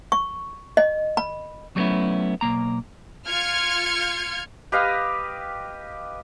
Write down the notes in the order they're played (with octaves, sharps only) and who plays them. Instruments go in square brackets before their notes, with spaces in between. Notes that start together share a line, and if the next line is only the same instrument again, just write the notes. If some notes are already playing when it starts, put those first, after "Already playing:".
[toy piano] C#6
D#5
B5
[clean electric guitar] F#3 G3 A3 B3 C#4 E4
B1 A#3 A#5
[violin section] F4 F6 G#6 C#7
[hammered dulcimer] G4 B4 D#5 F5